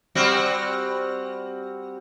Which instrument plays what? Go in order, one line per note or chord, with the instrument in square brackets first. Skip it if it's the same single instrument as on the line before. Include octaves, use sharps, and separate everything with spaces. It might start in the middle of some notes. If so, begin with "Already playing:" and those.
[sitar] G3 C4 F#4